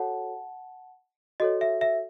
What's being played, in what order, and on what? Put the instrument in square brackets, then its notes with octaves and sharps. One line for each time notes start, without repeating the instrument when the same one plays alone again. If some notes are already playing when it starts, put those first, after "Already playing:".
Already playing: [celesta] F#4 A4 C#5 F#5 A5
F#4 A4 C#5 D#5
E5
E5